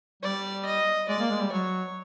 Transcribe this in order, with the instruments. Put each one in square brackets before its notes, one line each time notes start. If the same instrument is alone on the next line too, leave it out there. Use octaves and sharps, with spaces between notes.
[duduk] G3 [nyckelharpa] D5
[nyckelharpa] D#5
[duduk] G#3 [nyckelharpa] D5
[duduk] A#3
G#3
G3
[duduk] F#3 [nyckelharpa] C#5